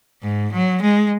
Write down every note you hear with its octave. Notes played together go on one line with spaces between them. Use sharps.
G#2
F#3
G#3